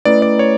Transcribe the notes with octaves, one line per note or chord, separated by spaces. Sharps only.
A3 C#4 E4 B4 D5
D5
C#5